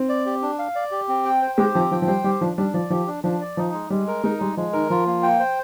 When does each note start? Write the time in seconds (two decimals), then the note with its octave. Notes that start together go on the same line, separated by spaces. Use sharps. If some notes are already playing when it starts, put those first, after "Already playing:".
Already playing: C4
0.09 D5
0.26 G4
0.42 D4
0.59 F5
0.75 D5
0.91 G4
1.08 C4
1.25 G5
1.42 C5
1.58 G#3 G4
1.74 F3 C4
1.91 F3 G5
2.02 F3
2.07 G3 C5
2.24 G3 G4
2.41 F3 D4
2.57 G3 D4
2.74 F3 D5
2.90 F3 G4
3.07 D4
3.24 F3 D4
3.41 D5
3.57 F3 D#4
3.73 G#3
3.90 G3 G#3
4.07 A#4
4.24 G#3 D#4
4.40 G3 G#3
4.57 F3 G#3
4.73 D#3 A#4
4.90 F3 F4
5.06 A#3
5.23 G5
5.40 C5